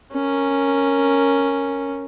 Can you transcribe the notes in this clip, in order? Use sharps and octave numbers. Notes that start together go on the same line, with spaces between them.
C#4 A#4